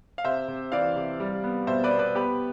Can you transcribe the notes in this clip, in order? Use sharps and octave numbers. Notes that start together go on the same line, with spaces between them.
F5
C3 C5 E5
C3
E3 D5 F5
C3
G3
B3
B2 C5 E5
B4 D5
B3
B4 D5
B3 G4 B4